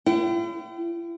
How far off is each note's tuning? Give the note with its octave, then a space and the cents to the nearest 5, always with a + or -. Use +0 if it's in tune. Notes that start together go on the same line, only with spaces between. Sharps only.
E4 +45 G5 -35